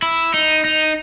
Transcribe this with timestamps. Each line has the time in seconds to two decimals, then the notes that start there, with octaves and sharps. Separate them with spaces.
0.02 E4
0.34 D#4
0.65 D#4